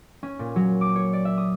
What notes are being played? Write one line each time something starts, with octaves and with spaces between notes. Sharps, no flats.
C#4
A#2
F#3
D6
C#5
D5
E5
D#6